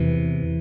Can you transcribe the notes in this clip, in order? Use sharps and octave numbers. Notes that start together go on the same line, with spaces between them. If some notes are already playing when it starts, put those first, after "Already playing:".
Already playing: E2 C3 E3